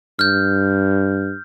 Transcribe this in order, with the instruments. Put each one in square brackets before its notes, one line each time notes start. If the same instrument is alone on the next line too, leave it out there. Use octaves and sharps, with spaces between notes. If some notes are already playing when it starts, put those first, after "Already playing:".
[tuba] G2 [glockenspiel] F6 G6